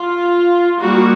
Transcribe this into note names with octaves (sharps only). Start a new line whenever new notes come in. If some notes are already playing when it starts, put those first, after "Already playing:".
Already playing: F4
G3 A#3 D#4 F#4